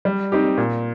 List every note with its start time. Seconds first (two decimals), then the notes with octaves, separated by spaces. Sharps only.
0.05 G3
0.32 C4 D#4 G4
0.58 A#2